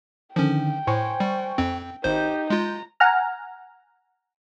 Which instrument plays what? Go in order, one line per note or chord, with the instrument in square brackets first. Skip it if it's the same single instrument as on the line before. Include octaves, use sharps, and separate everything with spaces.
[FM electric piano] D3 D#3 [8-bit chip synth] F3 C#4 [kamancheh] G5
[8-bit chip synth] A2 [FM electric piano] C5 G#5 C#6
[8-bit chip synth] G3
F2 C4
[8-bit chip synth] G#1 C5 [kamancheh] D#4 G4 [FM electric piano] G6
[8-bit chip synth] G#3 F4 [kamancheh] A#5
[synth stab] F#5 G#5 A#5 F6